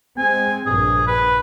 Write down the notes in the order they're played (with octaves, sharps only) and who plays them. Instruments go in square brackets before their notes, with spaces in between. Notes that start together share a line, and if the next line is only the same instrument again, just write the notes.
[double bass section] G#3 C4 [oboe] G#5
[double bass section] A#1 G2 [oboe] G#4
[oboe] B4